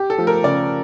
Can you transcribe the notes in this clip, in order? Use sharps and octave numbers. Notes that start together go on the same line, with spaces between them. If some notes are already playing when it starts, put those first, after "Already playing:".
Already playing: G4
A4
F3 A3
A#4
C#3 D5